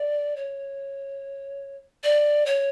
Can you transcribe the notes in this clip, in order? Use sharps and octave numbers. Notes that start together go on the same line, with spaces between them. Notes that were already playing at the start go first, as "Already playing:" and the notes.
Already playing: D5
C#5
D5
C#5